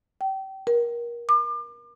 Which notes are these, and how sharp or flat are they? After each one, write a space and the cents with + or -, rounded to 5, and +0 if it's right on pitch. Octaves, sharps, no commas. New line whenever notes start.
G5 -30
A#4 +25
D6 +35